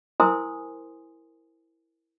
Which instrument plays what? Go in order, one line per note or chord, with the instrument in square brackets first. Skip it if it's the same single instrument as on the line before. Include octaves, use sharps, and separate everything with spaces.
[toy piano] E4 A#4 C5 G#5 C6 D#6